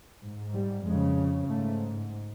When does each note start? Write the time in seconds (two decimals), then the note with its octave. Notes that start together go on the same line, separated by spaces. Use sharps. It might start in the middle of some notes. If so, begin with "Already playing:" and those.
0.21 G#2
0.54 G3
0.85 F2 C#3 G#3
1.48 G#2 A3